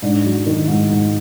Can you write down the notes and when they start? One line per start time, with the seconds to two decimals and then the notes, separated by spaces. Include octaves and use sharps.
0.02 G#2 D4
0.24 F#3
0.46 D#3
0.68 G#2
0.90 G#2